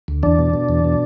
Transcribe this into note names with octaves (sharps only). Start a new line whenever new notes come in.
D2
E2 D4
B2
B2
E2
B2